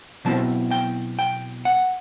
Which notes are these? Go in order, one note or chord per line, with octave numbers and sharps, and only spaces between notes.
B2 F#3 C4 E4 A5
G5
G5
F#5